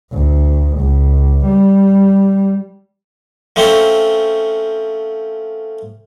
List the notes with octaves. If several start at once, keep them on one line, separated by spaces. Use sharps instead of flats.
D2
C#2
G3
F3 A3 C4 C#4 C5 C#5